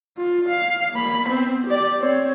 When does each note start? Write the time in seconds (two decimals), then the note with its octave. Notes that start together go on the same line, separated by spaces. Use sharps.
0.17 F4
0.49 F5
0.93 A#3 B5
1.27 B3 C4
1.67 G4 D5
2.00 C4 C#5